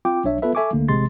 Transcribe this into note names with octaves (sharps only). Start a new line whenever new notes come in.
C4 F4 G5 D6
B1 D4 C#5 E5
B3 F4 A4 B4 E5
A4 E5 G#5 C#6 D6
D2 D3 A3 A#3
A1 C3 G#3 C6 A6